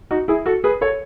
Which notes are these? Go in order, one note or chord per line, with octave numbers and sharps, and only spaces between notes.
D#4 F#4
E4 G#4
F#4 A4
G#4 B4
A4 C#5